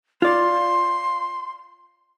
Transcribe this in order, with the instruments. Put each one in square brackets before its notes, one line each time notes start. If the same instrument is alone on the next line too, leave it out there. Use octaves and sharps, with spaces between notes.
[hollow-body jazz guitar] F4 D5 [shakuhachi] C6